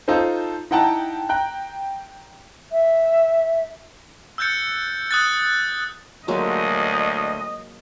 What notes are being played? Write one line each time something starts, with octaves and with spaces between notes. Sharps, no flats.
D#4 F4 A4 C5
D#4 E4 F#5 G5 A5 A#5
G5 A#5 F#6
E5
E6 F#6 G6 A6 C#7
D#6 F#6 A6
D2 F#3 G#3 A#3 D#5